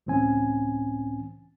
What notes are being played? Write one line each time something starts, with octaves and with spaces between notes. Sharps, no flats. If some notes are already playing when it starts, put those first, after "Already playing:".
C#2 A2 E3 C4 C#4 G#5